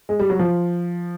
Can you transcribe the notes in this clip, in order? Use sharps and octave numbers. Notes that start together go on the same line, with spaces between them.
G#3
G3
F#3
F3